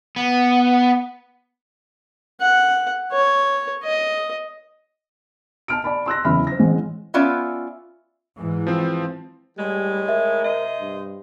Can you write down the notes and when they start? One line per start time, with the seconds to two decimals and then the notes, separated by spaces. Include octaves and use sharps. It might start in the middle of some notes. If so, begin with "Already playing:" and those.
0.16 B3
2.41 F#5
3.12 C#5
3.83 D#5
5.68 A5 F6 D7
5.84 D5 A5 B5
6.06 C6 E6 F#6 A#6
6.25 F#1 E2 E5 B5 F6
6.47 C5 A#6
6.59 A1 G#3
7.14 B3 C#4 F4 D5 E5
8.36 G#2 E3
8.67 F3 C4
9.58 A2 D#3 G3 G#3
10.09 A#4 E5
10.44 C3 C5 D#5
10.80 G2